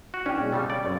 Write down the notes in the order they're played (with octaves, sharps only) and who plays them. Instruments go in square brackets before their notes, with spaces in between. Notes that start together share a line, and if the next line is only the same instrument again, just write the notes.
[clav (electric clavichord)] F#4
[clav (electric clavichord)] C#4 [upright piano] D4 G5
[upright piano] B2 G#3
[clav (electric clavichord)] C#3 G3 A4
D5
[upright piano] F#2 C#5